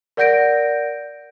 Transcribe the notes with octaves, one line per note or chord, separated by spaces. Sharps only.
A#4 D5 F#5 G6 A#6 D7